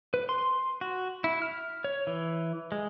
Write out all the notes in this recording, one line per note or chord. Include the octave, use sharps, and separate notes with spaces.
B4
C6
F#4
E4
F6
C#5
E3
G#3